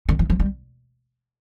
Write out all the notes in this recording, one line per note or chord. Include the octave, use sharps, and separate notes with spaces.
D3
E3
F3
G3